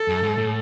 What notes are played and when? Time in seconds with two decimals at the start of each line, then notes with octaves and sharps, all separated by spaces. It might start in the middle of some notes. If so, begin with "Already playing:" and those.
Already playing: A4
0.08 F#2
0.23 G#2
0.38 A2